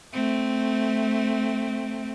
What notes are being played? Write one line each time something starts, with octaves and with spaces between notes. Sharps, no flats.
A3 C4